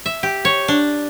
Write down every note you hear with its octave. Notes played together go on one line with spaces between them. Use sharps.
E5
G4
C#5
D4